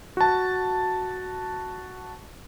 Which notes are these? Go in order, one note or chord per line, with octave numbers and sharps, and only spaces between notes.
F#4 A5